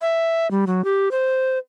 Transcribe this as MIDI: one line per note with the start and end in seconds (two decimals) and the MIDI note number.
0.01 0.50 76
0.51 0.65 55
0.67 0.84 54
0.85 1.11 67
1.11 1.58 72